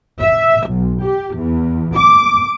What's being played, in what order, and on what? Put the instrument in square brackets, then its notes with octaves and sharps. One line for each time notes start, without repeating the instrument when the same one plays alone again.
[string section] E5
B1
G4
E2
D6